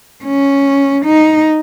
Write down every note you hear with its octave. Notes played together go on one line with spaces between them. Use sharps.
C#4
D#4